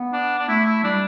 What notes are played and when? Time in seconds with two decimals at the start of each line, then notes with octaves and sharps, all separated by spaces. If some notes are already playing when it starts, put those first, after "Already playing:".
Already playing: B3
0.13 D4
0.39 D4
0.48 A3 E4
0.66 E4
0.84 G3 D4